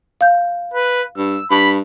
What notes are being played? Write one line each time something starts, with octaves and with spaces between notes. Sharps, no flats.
F5 G6
B4
G2 E6
G2 B5